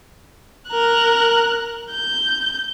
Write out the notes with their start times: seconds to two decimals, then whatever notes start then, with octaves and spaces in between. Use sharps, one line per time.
0.69 A#4 F#6
1.91 G6